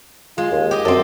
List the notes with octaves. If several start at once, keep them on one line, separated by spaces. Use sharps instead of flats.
G#3 F4
D#2
G4 D#5
F#2 C4 A4